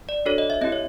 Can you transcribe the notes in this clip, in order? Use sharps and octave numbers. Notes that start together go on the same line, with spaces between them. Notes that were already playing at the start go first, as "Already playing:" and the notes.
D5
D4 F#4 A4 C#5
D#5
E5
C4 E4 G4 D#5
C#5